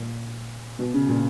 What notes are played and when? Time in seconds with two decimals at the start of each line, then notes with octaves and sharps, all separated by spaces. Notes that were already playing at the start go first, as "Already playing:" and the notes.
Already playing: A#2
0.79 B2
0.94 C#3
1.09 A#2